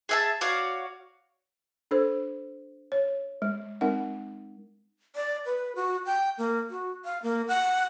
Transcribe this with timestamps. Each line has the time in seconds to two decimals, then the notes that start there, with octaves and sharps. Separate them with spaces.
0.09 G#4 E5 A5
0.41 F#4 C#5 D5 F5
1.91 D4 A4 C5
2.92 C#5
3.42 G#3
3.81 G#3 C4 D#4 A#4 F#5
5.16 D5
5.46 B4
5.76 F#4
6.06 G5
6.38 A#3
6.70 F#4
7.05 F5
7.23 A#3
7.48 F#5